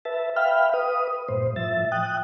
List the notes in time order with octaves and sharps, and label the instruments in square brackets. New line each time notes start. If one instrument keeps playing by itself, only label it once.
[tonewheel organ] B4 E5 A5
E5 F5 G5 B5 F6
B4 D#6
G2 A#2 C5
A2 F3 E5 A6
G5 D#6 F#6